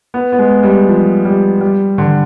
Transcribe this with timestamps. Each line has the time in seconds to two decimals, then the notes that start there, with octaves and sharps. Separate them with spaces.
0.14 B3
0.33 B3
0.39 G#3
0.63 G3
0.89 F3
1.25 G3
1.61 G3
1.98 D3